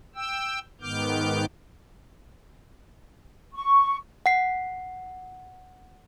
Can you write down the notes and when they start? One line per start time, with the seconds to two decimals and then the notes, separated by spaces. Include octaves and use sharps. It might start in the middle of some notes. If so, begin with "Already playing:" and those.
0.15 G5 E6
0.81 G#2 D#3 B3 D6 F6 G6
3.53 C#6
4.26 F#5 C7